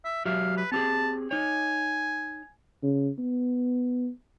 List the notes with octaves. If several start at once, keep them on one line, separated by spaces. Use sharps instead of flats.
E5
F#3 G4 E5 F5
B4
C4 G4 G#4 A5
D#4 C#5 G#5
C#3
B3